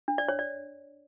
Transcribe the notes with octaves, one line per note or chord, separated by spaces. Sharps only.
D4
D5
C#5
D5